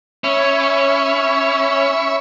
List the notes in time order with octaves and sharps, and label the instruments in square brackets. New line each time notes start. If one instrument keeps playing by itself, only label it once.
[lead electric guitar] C#4 [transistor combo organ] E5 B5 C#6